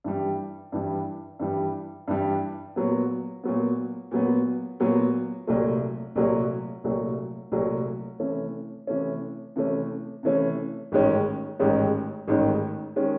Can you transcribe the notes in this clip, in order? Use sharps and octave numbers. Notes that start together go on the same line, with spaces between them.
G2 E3 G3
G2 E3 G3
G2 E3 G3
G2 E3 G3
A#2 F#3 B3
A#2 F#3 B3
A#2 F#3 B3
A#2 F#3 B3
C2 A#2 F#3 A3
C2 A#2 F#3 A3
C2 A#2 F#3 A3
C2 A#2 F#3 A3
C3 E3 A3 C#4
C3 E3 A3 C#4
C3 E3 A3 C#4
C3 E3 A3 C#4
A1 G#2 D#3 G#3 C#4
A1 G#2 D#3 G#3 C#4
A1 G#2 D#3 G#3 C#4
D#3 G#3 C#4